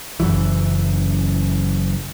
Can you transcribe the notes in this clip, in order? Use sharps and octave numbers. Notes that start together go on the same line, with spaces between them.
F#1 C#2 F#2 E3